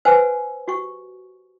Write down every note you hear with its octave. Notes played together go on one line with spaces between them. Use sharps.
B4 C5 F#5 G#5 E6
F#4 G4 C#6